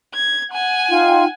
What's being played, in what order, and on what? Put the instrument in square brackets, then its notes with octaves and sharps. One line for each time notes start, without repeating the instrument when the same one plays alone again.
[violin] G#6
F#5 G#5
[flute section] D#4 F4 G5